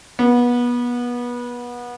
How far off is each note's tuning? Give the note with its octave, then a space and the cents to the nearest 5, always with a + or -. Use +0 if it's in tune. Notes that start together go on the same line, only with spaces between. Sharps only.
B3 -25